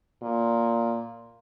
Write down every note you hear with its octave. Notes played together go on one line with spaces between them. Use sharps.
A#2